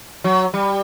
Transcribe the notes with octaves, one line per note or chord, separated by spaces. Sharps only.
F#3
G3